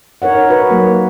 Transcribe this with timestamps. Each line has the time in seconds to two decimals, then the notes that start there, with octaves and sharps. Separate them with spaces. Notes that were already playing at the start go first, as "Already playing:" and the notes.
0.22 D#4 A#4 C#5 F#5
0.49 F#4 B4
0.70 F#3 A#3